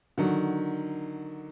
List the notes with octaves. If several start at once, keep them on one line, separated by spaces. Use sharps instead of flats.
D3 D#3 F#3